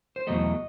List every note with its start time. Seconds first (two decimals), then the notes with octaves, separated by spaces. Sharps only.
0.16 C5
0.27 E2 B2 F#3 A3 D#5